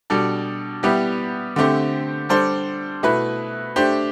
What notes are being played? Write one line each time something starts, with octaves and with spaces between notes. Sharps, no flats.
B2 G3 D4 A4
G3 B3 E4 G4
D3 A3 C4 G4 C5
G3 D4 A4 C5
B2 A3 E4 B4
A3 D4 G4 C5